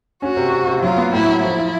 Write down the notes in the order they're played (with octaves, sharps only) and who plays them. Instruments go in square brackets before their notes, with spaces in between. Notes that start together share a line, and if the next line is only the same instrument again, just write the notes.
[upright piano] C#4 [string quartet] F#4
[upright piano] C3
C3
C3
[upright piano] F#3 [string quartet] F4
[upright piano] B3
[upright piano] A2 [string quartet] E4
[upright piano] F#3
[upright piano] F3 [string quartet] E4
[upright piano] F3